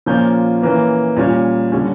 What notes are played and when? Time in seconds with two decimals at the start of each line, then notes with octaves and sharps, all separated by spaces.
0.06 A#2 F3 A#3 C#4 G6
0.62 E3 A#3 C#4
1.17 A#2 G3 C#4
1.72 D3 G3 C#4